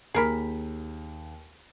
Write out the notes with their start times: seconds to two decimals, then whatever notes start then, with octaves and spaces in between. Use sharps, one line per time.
0.14 D#2 G#4 A#4 B5